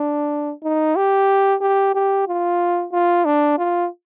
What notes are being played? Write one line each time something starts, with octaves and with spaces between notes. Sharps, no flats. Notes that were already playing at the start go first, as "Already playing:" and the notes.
Already playing: D4
D#4
G4
G4
G4
F4
F4
D4
F4